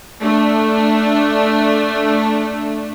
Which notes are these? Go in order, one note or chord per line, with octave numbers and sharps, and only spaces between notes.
A3 D4